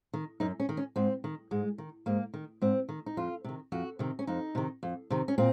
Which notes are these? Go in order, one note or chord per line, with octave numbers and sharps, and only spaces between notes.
D#3
F#2 D#4
C#4
D#3
C#4
G#2 C4
D#3
G#2 G#3
D#3
G#2 A#3
D#3
G#2 C4
D#3
D#4
F2 F4
C3 D#3
F2 F#4
C3 D#3
C#4
F2 D#4
C3 D#3
F2
C3 D#3
C#4
A#2 C4